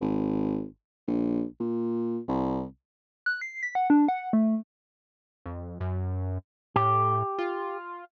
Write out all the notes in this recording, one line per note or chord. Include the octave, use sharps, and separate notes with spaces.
G#1
A#1
A#2
C2
F#6
C7
B6
F#5
D4
F#5
A3
F2
F#2
A2 G4
F4